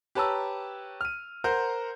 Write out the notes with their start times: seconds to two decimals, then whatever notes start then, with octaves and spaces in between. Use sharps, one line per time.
0.15 G4 B4 C#5 A5 A#5 E6
1.01 F6 D#7
1.44 A#4 C5 F#5 A#5 G6